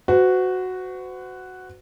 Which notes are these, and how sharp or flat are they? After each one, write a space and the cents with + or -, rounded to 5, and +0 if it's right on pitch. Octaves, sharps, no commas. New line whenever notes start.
F#4 +0 C5 -45